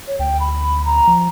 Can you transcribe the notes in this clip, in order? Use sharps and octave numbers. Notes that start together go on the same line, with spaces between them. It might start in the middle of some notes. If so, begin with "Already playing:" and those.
C#5
D2 G5
B5
A#5
F3